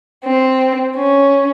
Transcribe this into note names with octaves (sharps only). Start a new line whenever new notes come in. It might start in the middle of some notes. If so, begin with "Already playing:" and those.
C4
C#4